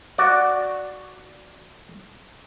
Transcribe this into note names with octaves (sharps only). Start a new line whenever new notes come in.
F#4 D5